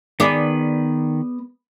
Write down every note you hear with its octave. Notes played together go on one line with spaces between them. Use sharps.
D#3 B3 G#4 D5 B5